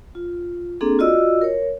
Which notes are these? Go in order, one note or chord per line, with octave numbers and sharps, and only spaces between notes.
F4
A#3 C4 D4 G#4 A4
F4 F#4 D5 D#5 E6
A#4 C#5